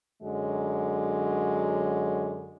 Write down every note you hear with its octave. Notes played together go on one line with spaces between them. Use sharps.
F#2 D3 F#3 G#3